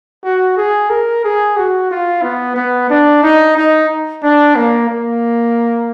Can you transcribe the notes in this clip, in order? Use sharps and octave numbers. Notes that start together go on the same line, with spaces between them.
F#4
G#4
A#4
G#4
F#4
F4
B3
B3
D4
D#4
D#4
D4
A#3
A#3